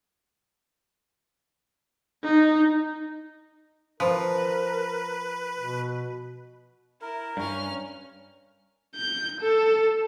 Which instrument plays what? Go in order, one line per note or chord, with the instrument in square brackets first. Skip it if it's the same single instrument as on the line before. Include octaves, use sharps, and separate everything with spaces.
[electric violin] D#4
[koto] F3 [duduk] A#4 [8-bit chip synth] B4
[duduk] B2
[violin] E4 [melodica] A#4
[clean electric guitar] G2 [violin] C#4 F6
[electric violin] G6
A4